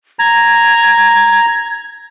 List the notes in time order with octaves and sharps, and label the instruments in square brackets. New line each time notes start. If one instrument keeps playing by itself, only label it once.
[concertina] A#5 [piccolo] G#6